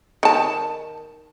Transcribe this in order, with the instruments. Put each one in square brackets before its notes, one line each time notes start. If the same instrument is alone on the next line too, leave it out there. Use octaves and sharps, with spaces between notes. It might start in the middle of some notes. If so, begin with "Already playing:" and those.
[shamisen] D#3 A5